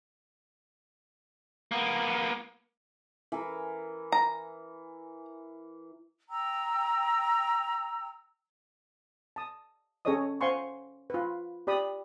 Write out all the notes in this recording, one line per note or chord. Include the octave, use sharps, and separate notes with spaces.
A#3 B3
E3 A#4
A#5
G5 A#5 E6
A5 D#6
C#4 G#4 A4 C#5 D#5 D#6
C5 F5 F#5 G#5 C6 C#6
F4 B4
G4 D5 B5 D#6